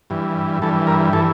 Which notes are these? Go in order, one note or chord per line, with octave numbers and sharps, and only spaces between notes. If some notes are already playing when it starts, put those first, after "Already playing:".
G2 E3
G2 E3 A4
A#4
E3 A4